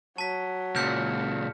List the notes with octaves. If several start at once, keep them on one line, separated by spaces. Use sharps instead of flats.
F#3 A5 B6
C#2 A#2 F6 G6 C#7